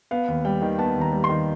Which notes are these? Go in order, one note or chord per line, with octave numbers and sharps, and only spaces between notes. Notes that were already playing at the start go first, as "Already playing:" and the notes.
B3 F5
D#2
G3 G5
D#3
B3 A5
D#2
A#5
G3
C6
D#3